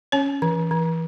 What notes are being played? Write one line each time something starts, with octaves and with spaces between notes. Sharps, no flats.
C#4 C#5
E3
E3